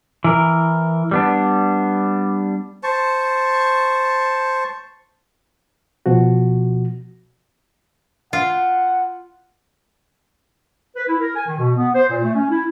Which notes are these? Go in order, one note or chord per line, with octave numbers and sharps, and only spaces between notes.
E3 A#4
G3 B3 D4
C5 A5 C#6
B2 F3 F#4
F4 F#5
B4
E4
A#4
G#5
D#3
B2
B3
C5
A#2
A3
C#4
E4